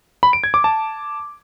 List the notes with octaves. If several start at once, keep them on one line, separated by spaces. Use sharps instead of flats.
B5
D7
G#6
D6
A5